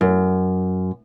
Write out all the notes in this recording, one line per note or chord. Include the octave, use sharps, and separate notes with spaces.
F#2